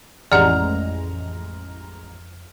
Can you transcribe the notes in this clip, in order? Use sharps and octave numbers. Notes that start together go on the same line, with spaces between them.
A1 F2 G#3 D5 F#5 A#5 F6